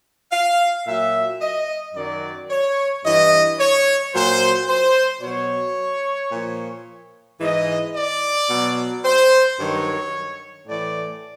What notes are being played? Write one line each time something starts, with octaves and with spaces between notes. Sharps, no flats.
F5
A#2 F#3 E5
D#5
F#2 D#3 F#3 D5
C#5
G2 E3 D#5
C#5
A#2 F#3 C5
C5
B2 F#3 C#5
A#2 F3
G#2 E3 D#5
D5
B2 F#3
C5
G2 D#3 F#3 C#5
A2 E3 D5